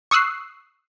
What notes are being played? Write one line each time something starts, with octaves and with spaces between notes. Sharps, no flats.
C#6 D#6 E6 F#6 C7